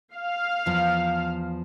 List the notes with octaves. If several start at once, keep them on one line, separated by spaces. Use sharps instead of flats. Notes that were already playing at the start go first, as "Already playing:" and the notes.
F5
E2 F3